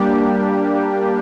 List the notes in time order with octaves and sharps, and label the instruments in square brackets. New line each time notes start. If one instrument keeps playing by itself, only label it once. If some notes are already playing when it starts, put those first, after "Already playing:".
Already playing: [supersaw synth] G3 A#3 D4 G4